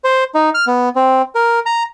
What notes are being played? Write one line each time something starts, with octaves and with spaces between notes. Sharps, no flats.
C5
D#4
F6
B3
C4
A#4
A#5